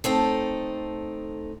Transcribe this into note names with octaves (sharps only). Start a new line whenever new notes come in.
A3 C4 D#4 A4